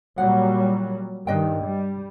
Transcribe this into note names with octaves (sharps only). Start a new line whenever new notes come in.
A#2 F#3 G3 F#5
G2 D#3 D4 D#5 G5
G3